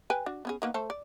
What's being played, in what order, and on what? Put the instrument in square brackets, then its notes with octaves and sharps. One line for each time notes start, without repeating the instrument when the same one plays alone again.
[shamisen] B4 G5 G#5
D4 F#4
B3 C#4 G#4
D#3 A#3 B3
A3 A4 C5
D5